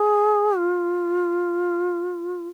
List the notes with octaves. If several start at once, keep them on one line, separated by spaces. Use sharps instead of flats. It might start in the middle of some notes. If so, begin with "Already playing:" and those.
Already playing: G#4
F4